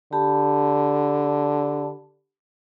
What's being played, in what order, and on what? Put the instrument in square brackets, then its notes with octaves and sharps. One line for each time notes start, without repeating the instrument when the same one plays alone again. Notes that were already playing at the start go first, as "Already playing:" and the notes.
[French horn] D3 [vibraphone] G4 A5 B5